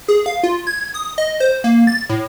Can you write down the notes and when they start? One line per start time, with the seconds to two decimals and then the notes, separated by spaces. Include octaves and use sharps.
0.08 G#4
0.26 F5
0.43 F4
0.67 G#6
0.94 D#6
1.18 D#5
1.40 C5
1.64 A#3
1.87 A6
2.09 A2